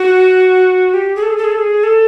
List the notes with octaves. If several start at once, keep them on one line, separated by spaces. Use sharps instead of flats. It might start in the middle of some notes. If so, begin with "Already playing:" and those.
Already playing: F#4
G4
G#4
A4
G#4
A4
G#4
A4
G#4
A4